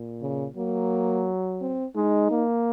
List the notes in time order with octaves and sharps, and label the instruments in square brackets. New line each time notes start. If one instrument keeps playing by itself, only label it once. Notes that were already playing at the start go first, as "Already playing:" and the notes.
Already playing: [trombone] A#2
[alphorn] C#3
[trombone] F#3 [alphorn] A#3
[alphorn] C4
[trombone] G#3 [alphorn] D#4
[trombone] A#3